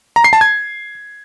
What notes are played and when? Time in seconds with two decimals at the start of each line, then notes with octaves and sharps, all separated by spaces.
0.16 A#5
0.24 C7
0.33 A5
0.41 G#6